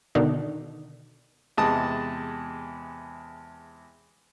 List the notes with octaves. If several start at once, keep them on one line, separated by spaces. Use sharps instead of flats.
B2 D3 D#3 D4 D#4
E2 C3 G#3 A5 D#6